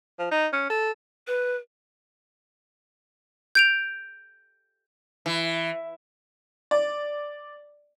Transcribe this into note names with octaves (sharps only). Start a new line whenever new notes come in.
F3
D#4
C#4
A4
B4
G6 D7 F7
E3
D5